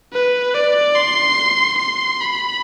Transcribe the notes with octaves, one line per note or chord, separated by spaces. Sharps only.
B4
D5
C6
C6
B5